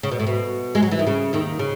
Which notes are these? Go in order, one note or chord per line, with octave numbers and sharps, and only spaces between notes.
C#3
B2
A2
B2
G#3
F#3
E3
D#3
C#3
D#2 D#3
C#3